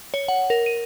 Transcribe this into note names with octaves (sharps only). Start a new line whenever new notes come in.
C#5
F#5
A#4
D#7